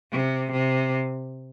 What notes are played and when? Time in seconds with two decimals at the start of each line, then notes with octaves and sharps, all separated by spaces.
0.12 C3
0.51 C3